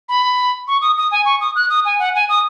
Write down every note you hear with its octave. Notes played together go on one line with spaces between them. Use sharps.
B5
C#6
D#6
D#6
G#5
C#6
D#6
F#6
D#6
G#5
F#5
G#5
D#6